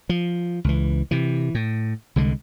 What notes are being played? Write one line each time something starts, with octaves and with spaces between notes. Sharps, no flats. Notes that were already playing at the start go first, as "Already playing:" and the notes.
F3
C#2 E3
C3 E3
A2
C2 D3 G#3